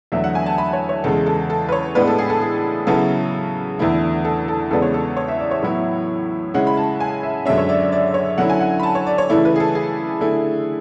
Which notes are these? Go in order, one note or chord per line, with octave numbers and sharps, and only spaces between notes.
E2 D3 F#3 A3 E5
F#5
G#5
A5
B5
C#5
C#5
E2 C#3 G#3 A4
A4
A4
B4
C#5
A2 G#3 B3 D4 B4
A4
G#4
A4
G#4
C#3 F#3 B3 E4 A4
E2 D3 A3 E4
A4
A4
E2 C#3 G#3 B3 D4 A4
C#5
A4
C#5
E5
D5
C#5
A2 F#3 B3 E4
C#3 G#3 C#4 E4 F#5
B5
A5
G#5
E5
F#2 D3 G#3 C#4 E5
C#5
D5
D5
D5
C#5
D3 F#3 C#4 E4 F#5
G#5
F#5
B5
A5
C#5
D5
C#5
C#3 E3 A3 E4 D5
B4
G#4
A4
G#4
D3 A3 E4